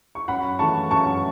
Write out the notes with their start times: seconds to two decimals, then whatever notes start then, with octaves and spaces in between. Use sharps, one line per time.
0.15 C#6
0.28 F#2 F#5 B5
0.59 E3 A3 A5 C#6
0.91 F#2 A5 C#6